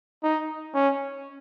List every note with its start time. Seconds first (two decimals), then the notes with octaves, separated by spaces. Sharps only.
0.23 D#4
0.74 C#4